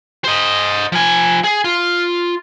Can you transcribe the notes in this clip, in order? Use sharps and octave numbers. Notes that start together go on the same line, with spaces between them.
C5 D#5
F3 G#5
G#4
F4